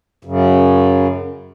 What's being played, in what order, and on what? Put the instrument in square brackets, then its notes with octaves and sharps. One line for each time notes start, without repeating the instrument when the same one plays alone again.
[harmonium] F#2 C#3